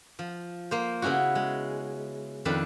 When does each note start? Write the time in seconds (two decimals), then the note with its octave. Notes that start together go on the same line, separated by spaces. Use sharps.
0.19 F3
0.71 A#3 C5
1.02 C#3 B3 C#4 E4 F#4
1.35 G#3
2.45 F2 D#3 D4 B4 E5 A5